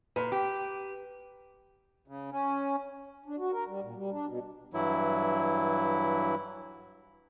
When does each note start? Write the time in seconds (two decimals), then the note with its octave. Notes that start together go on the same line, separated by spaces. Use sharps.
0.16 A#2 B4
0.32 G4
2.08 C#3
2.32 C#4
3.26 D4
3.39 F#4
3.53 A#4
3.68 G3
3.83 A#2
3.94 G3
4.11 D4
4.26 B2
4.74 G2 E3 F#3 E4